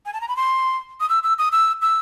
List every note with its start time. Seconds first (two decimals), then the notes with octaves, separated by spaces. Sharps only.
0.06 G#5
0.13 A5
0.21 A#5
0.28 B5
0.36 C6
1.00 D#6
1.09 E6
1.23 E6
1.38 D#6
1.52 E6
1.82 E6